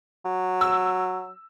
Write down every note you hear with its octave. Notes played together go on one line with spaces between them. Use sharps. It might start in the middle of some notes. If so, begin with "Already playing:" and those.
F#3
E6